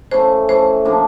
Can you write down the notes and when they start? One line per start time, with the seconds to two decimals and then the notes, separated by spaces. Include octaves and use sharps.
0.11 C#3 E3 A3 C5
0.48 C#3 E3 A3 C5
0.85 D3 F3 A#3 D4